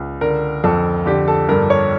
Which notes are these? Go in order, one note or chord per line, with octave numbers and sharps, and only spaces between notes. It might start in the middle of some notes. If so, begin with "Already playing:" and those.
Already playing: C#2
D3 A#4
F2 A4
D3 G4
A4
G2 A#4
C#5